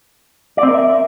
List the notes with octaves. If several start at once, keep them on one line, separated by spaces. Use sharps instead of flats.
D5
C4
A#4
E5